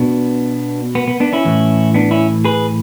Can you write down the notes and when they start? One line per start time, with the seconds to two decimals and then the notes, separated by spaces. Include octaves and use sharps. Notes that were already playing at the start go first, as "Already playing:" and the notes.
Already playing: B2 B3 D4
0.95 B3
1.08 B3
1.20 B3 D4
1.33 C#4 E4
1.45 A2 E3
1.94 B3 D4
2.11 C#4 E4
2.45 G#4 B4